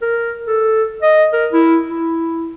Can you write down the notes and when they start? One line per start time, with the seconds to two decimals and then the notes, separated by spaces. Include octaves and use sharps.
0.02 A#4
0.47 A4
1.02 D#5
1.33 A#4
1.53 E4
1.90 E4